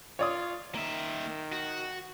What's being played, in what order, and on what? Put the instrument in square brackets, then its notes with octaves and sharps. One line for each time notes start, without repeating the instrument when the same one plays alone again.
[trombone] F4 [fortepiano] C#5 D5 D#6
[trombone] D#3 [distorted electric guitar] A#3 E5
[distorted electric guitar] F#4